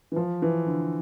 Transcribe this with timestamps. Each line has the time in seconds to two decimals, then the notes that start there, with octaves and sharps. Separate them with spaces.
0.12 E3
0.16 F3
0.42 E3
0.66 D3